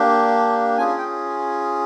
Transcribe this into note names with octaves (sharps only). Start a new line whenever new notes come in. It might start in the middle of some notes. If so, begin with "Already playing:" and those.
Already playing: A#3 D4 G4
C#4 F4 G#4 G#5
G5